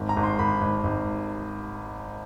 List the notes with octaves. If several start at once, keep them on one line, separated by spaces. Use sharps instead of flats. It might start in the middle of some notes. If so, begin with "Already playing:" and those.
Already playing: G#1
A#5
G#1
C6
G#1 B5
G#1
G#1